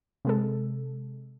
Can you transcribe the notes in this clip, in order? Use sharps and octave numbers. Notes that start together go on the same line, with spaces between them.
C3 G#3 A4